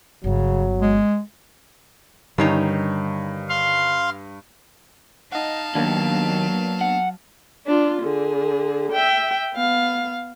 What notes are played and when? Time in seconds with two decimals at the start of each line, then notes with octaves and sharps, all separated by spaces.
0.24 G1 C#3 F#3 B3
0.81 G#3
2.38 G2 D3 D#3 G3 C#4 D#4 C7
3.49 F5 C6
5.32 D#4 D#5 F5 F#5 A5
5.75 D#2 F#3 A#3 B3 D4
6.81 F#5
7.67 D4 F4
8.02 D3 G#4
8.92 E5 G5
9.54 B3 F5